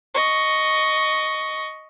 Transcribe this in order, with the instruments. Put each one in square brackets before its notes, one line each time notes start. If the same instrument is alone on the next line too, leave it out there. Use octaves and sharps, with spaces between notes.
[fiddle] D#5 C#6